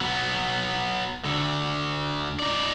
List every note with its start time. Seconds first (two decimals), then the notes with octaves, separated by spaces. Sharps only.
0.01 F#3 B3
1.25 D2 D3
2.40 D#4 D5